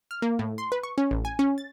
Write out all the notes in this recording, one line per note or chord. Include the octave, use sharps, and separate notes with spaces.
F6
A#3
A2
C6
B4
C#6
C#4
A1
G#5
C#4
A6